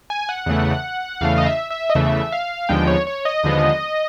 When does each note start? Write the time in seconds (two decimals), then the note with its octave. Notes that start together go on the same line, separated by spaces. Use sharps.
0.10 G#5
0.29 F#5
0.46 E2 C#3 E3 A3
1.21 E2 C#3 E3 A3 F5
1.38 D#5
1.46 E5
1.70 E5
1.90 D#5
1.95 E2 C#3 E3 A3 E5
2.32 F5
2.69 D#2 D3 F3 G#3 B3 G5
2.87 C#5
3.07 C#5
3.25 D#5
3.43 D#2 D3 F3 G#3 B3